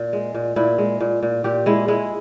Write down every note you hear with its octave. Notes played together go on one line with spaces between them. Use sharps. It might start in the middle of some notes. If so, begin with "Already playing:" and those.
Already playing: A#2
G#3
A#2
A#2 E4
G#3
A#2
A#2
A#2 G4
G#3 E4
G#3 E4